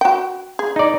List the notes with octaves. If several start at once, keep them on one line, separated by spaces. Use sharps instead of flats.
F#4 G5
G#4
D#4 D5